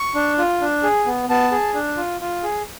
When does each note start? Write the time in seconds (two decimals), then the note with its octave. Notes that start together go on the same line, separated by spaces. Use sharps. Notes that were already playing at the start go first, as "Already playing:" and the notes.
Already playing: C#6
0.15 D4
0.38 F4
0.61 D4
0.83 G#4
1.06 B3
1.29 B3 A5
1.52 G#4
1.74 D4
1.97 F4
2.21 F4
2.43 G#4